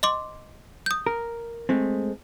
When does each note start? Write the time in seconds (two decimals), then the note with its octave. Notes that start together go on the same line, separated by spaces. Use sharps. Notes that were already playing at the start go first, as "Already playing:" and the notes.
0.03 D#5 C6 D6
0.86 D#6 G6
1.06 A#4
1.69 G#3 A3 C4